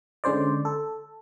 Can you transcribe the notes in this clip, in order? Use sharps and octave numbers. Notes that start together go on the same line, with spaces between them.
D3 G#3 C#4 C5 D5
A4